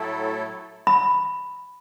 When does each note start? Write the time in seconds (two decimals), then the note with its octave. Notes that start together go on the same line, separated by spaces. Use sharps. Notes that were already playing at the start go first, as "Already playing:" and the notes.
Already playing: A2 F#3 A3 E4 A4
0.87 B5